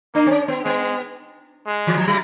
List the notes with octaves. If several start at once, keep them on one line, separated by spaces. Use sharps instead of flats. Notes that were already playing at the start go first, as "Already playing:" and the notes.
A#3 D4
C4
C#4
B3
G#3 B3
G#3
E3
F3
F#3